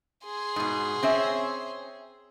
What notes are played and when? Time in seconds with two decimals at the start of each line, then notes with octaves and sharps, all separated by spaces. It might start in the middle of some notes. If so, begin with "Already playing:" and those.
0.24 G#4 C6
0.56 G#2 B2
1.03 C4 C#4 E5